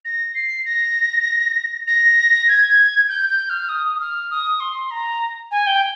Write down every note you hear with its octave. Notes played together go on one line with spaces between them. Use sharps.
A#6
C7
A#6
A#6
G#6
G6
G6
F6
D#6
D#6
F6
D#6
C6
A#5
G#5
G5